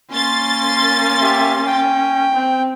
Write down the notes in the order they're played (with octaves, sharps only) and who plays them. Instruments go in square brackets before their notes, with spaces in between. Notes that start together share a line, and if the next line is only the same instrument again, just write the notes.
[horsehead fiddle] A#3 C#4 [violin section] C6 A6
[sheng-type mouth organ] G4 E5
G5
[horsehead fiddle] C4